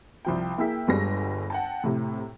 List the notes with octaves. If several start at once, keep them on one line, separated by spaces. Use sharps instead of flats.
C2 F3 G5
A#3 E4 G#4 G5 E6 B6
G1 D3 G3 G#3 B4 A#6
F#5 G5 A5
A2 C3